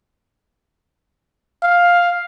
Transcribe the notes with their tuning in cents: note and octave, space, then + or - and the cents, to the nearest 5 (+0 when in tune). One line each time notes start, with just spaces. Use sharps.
F5 +5